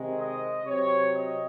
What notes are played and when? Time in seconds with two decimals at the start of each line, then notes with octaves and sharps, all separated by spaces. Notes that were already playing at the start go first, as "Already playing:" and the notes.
Already playing: C3 D#3 G#3
0.19 D#5
0.65 C3 F#3 C4 C#5
1.13 D#5